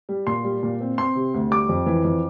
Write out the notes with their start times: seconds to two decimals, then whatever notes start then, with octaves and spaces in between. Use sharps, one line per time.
0.09 G3
0.27 A#2 C6
0.44 G3
0.63 A#2
0.81 C4
0.98 C4 C6
1.15 C3
1.34 D2
1.51 G3 D6
1.69 F2
1.86 E3
2.04 F2